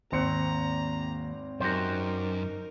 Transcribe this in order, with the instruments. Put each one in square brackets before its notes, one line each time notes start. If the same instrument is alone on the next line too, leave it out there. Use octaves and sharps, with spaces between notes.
[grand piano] G#1 C4 C#7 [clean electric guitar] D#2 [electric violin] A#5
[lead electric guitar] F#2 [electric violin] D#4 A#4 [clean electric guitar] F#4 G4 C5